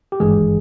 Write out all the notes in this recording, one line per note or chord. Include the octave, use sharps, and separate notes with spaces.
G4
G#1 G2 E3 G#3 G#4